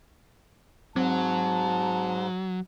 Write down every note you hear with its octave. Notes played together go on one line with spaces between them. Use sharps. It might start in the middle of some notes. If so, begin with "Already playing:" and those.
G#2 F#3 C4 A5